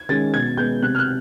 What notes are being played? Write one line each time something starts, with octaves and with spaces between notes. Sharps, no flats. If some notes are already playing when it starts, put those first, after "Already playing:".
Already playing: G#6
D#3 G#3 C#4 A6
B2 G#6
G#3 B3 G6
C3 F#6
F6
F#6